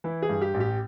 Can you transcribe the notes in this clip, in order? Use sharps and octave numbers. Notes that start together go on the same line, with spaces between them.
E3 E4
G#4
G2
G4
A1
G4